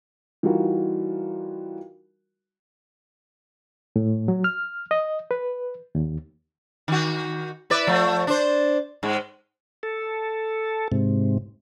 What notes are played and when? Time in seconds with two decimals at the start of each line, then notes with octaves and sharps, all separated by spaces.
0.43 E3 G3 D#4 F4 F#4 A#4
3.96 A2
4.28 F#3
4.44 F6
4.91 D#5
5.31 B4
5.95 D#2
6.88 D#3 F#4
7.70 E4 B4 D5
7.87 F3 A3
8.27 D4 C5
9.03 G#2 G#3
9.83 A4
10.92 G#2 C3